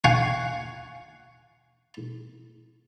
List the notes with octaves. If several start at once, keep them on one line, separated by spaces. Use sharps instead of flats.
F5 F#5 G#5 C#6